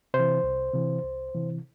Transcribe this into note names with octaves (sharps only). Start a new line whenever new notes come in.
C3 C5
E3
C2
C3 E3
C2
C3 E3